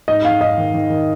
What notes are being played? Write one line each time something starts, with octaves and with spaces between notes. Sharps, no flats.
G#2 D#5
G#2 F5
G#2 D#5
D#3
D#3
D#3